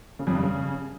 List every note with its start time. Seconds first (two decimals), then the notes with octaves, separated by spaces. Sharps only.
0.19 C#3
0.27 F2
0.35 G2
0.42 C#3